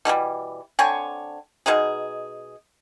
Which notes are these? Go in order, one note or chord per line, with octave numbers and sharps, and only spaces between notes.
B2 E3 F3 G3
D3 C4 C#5 G#5
B2 G#3 D#4 G#4